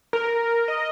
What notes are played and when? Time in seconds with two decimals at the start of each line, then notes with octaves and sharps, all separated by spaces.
0.13 A#4
0.68 D#5